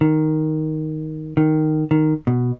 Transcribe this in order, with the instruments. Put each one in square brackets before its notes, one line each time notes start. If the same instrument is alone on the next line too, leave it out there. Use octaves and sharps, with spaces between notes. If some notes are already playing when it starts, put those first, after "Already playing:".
[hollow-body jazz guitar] D#3
D#3
D#3
B2